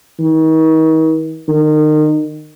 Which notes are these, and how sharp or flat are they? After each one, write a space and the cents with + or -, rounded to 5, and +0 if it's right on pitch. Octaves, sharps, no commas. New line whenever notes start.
D#3 +40
D#3 -30